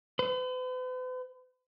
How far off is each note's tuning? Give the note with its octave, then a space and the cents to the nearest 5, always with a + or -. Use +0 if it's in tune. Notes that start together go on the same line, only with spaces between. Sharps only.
B4 +45